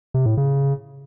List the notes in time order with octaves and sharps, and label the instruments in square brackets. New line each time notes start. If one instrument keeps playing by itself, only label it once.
[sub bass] C3
A2
C#3